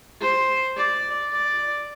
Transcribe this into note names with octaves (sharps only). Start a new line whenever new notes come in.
C5
D5
D5